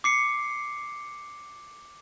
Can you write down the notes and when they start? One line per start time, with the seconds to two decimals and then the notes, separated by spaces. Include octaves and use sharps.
0.04 D6 C7 C#7